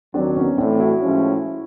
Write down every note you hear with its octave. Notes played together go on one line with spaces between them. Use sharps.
D#2 D#3 F#3 C4 D4
B3 C#4
A2 E3 A3 C4 D4
E4 F#4
A2 F3 G#3 C#4